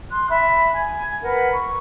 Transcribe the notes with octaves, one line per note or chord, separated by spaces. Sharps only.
C6 F#6
E5 B5
G#5
A#4 B4 F#5
C#6